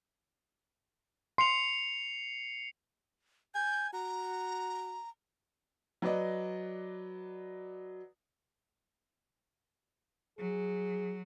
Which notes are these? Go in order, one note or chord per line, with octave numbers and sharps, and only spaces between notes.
C6 C7 C#7 F7
G#5 G6
F#4 A#5
F#3 B4 D5 D#5
F#3 G#4